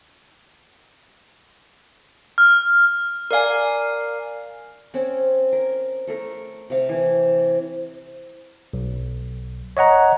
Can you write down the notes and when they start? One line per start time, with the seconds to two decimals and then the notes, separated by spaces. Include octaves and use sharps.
2.38 F6
3.31 A#4 D5 F5 G#5
4.94 C4 C#4
5.53 A#4
6.07 A3 A4 A#4
6.70 C3 F5
6.89 E3
8.73 B1
9.77 C#5 D#5 F#5 A#5